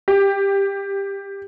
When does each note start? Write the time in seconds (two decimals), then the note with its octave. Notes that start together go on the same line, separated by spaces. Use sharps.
0.08 G4